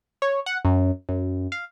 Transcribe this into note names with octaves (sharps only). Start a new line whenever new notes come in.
C#5
F#5
F#2
F#2
F5